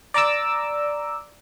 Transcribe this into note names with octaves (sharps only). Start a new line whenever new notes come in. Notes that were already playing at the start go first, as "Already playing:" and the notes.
D5 A#5 D6 E6